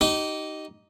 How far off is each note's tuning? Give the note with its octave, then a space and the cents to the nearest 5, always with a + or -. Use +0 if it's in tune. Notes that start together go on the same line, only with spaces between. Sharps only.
D#4 +0 G4 -30